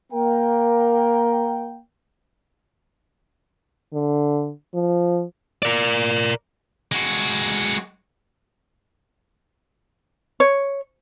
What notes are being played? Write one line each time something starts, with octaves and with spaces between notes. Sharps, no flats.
A#3 A#4 G5
D3
F3
A#4 D5
G#3 F#4
C#5